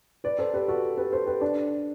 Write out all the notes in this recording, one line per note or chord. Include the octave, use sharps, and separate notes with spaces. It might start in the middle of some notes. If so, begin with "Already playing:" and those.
B4 D5
A4 C5
G4 B4
F#4 A4
G4 B4
A4 C5
G4 B4
D4